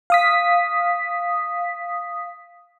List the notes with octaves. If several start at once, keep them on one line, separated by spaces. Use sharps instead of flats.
F5 D#6 B6